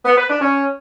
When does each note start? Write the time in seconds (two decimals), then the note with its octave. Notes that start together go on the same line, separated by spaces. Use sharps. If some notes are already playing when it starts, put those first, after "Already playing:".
0.05 B3
0.17 B4
0.28 D4
0.40 C#4